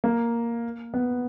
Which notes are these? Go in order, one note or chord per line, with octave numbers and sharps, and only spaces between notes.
A#3
B3